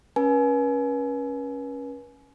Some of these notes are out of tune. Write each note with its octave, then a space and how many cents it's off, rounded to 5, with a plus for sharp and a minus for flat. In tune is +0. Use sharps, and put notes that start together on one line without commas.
C#4 +0 B4 -40 G#5 +30